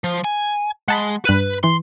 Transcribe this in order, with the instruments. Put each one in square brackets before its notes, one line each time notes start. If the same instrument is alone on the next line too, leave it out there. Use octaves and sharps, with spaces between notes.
[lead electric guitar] F3
G#5
[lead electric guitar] G#3 [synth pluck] F#5 A5 B5
[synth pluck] G2 F#6 D#7 [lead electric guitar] B4
[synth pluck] E3 [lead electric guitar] C6